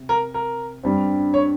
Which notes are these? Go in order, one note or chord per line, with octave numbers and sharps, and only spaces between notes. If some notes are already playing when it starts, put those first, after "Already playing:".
Already playing: C3
A#4
A#4
G2 G3 C4
C#5